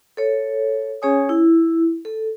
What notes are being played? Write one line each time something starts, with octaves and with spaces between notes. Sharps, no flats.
A4 C#5
C#4 G#4 C#5 G#5 D#6
E4
A4